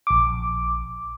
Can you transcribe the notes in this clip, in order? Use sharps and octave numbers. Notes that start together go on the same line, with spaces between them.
A#1 D6